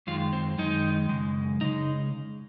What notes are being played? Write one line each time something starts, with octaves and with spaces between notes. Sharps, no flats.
F#2 D#3 G#3 F4
C4
F#2 D#3 G#3 D#4
F#2 C#3 G#3
C#3 G#3 D#4